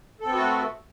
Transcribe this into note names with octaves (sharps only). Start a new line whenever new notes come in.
A3 B3 C4 F#4 A4